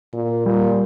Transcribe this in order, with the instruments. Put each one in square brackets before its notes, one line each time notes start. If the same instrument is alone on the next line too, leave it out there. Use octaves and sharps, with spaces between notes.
[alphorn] A#2
[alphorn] A#2 [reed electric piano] G3